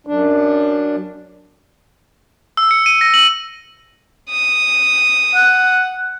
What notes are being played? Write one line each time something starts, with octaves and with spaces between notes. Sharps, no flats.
F#2 D4
E6
C#7
D#7
A#6
F#7
D#6
F#5